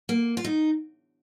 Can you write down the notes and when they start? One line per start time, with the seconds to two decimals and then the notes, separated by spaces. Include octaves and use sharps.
0.09 A#3
0.37 F4
0.44 D#4